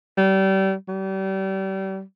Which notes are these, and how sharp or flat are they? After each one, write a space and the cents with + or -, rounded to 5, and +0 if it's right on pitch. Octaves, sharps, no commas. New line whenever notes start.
G3 -30
G3 -35